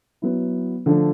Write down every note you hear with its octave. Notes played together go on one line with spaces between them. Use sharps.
F#3 B3 E4
D3 F3 A3 D4